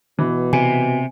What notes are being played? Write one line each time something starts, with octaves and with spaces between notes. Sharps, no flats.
B2 E3
C3 G#5